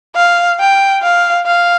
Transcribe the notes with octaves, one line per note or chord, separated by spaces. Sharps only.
F5
G5
F5
F5